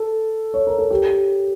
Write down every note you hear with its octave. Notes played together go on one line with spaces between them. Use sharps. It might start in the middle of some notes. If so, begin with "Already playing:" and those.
Already playing: A4
C#5
A#4
A4
G4